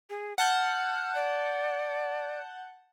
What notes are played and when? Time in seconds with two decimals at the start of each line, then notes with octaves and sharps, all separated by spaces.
0.10 G#4
0.38 F#5 A5 F6 G6
1.15 D5